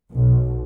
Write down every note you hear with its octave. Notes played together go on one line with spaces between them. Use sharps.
B1